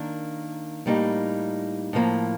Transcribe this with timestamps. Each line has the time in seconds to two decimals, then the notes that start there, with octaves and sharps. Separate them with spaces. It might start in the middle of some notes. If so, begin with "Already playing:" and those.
Already playing: D#3 A#3 D4
0.86 A2 G3 A#3 D#4
1.93 A2 F3 A#3